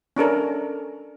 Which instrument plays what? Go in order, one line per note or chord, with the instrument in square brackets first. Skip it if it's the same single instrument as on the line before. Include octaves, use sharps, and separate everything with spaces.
[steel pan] C#4 D4 A4 A#4